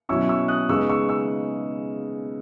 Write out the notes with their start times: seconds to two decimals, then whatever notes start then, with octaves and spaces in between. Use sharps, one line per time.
0.09 B2 F#3 C#4 E4 C#6 E6
0.29 C#6 E6
0.48 D#6 F#6
0.69 C#3 G#3 B3 D#4 C#6 E6
0.89 C#6 E6
1.09 C#6 E6